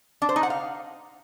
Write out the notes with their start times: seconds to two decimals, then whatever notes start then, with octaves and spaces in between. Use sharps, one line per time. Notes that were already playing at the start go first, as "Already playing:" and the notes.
0.22 D4
0.29 C5
0.36 D#4
0.43 F#5
0.50 F5